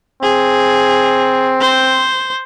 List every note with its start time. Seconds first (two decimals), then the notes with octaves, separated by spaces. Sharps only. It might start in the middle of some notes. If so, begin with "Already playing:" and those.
0.23 C4 G#4
1.60 C5